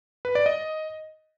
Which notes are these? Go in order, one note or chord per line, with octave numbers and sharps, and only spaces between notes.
B4
D5
D#5